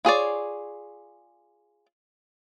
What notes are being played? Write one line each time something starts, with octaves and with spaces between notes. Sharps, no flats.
F4 G#4 C#5 D5